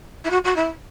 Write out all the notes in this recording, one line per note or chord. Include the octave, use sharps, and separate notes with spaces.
E4
F#4
F#4
E4